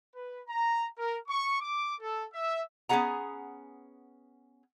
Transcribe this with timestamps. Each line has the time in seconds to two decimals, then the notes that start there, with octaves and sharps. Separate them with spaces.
0.15 B4
0.48 A#5
0.98 A#4
1.27 C#6
1.60 D6
2.00 A4
2.33 E5
2.89 B3 C#4 F#4 G#4 F#5 A#5